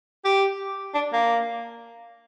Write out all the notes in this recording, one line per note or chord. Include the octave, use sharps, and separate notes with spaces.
G4
D4
A#3